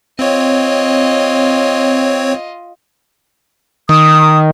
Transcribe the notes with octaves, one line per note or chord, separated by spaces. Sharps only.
C4 F4 C#5 D#5
D#3 D#6